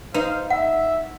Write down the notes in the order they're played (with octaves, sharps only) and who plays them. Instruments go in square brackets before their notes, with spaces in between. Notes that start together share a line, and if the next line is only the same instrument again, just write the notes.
[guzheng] D#4 [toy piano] B4 [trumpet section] C5 F5
[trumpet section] E5 [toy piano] F#5